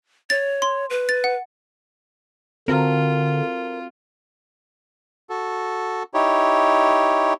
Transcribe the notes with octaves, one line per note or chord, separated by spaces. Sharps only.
C#5 A6
C6
B4
A6
F#5
D3 C4 F4 F#4 A4 A#4
F#4 A4
D#4 E4 G4 C#5